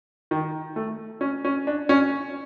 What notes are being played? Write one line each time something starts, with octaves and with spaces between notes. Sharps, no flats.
D#3
A3
C#4
C#4
D4
C#4